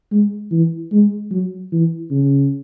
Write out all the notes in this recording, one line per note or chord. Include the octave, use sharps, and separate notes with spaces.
G#3
E3
G#3
F#3
E3
C#3